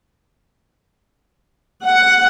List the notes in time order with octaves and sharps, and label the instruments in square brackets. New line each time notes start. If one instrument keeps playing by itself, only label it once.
[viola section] F#5